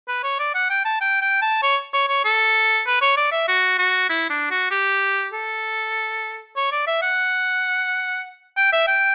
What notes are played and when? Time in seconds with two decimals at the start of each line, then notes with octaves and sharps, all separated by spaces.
0.08 B4
0.23 C#5
0.39 D5
0.55 F#5
0.70 G5
0.85 A5
1.01 G5
1.21 G5
1.42 A5
1.63 C#5
1.93 C#5
2.09 C#5
2.25 A4
2.86 B4
3.01 C#5
3.17 D5
3.32 E5
3.48 F#4
3.78 F#4
4.10 E4
4.30 D4
4.51 F#4
4.71 G4
5.33 A4
6.56 C#5
6.72 D5
6.87 E5
7.02 F#5
8.57 G5
8.73 E5
8.88 G5